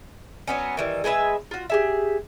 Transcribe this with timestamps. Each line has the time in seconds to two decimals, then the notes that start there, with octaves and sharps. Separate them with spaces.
0.47 F#3 B3 C#4
0.77 D#3 E3 G3
1.04 G#3 G#4 B4 E5
1.51 F4 F#4
1.70 G4 G#4 E5